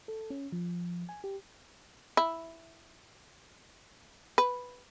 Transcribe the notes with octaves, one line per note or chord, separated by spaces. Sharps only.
A4
C#4
F3
G#5
G4
E4
B4